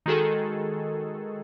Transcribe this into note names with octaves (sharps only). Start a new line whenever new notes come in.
D#3 G#3 F#4 G#4 A4